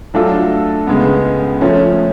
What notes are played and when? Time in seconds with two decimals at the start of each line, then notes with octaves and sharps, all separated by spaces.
0.14 F#3 A3 D4 F4 A4
0.87 C#2 C#3 G#3 B3
1.61 F3 A3 C#4